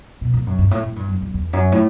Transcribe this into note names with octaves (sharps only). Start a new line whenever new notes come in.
B2
A2
F#2
G2
A2
A2
G2
F#2
F#2
E2
F#2
A2